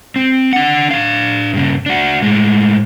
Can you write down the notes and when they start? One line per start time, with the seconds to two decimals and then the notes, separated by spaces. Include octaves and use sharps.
0.16 C4
0.53 D4 F#5
0.90 D4 F5
1.54 G2 C#3
1.86 D4 F#4
2.22 A2 G#3